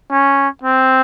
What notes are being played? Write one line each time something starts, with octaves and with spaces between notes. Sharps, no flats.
C#4
C4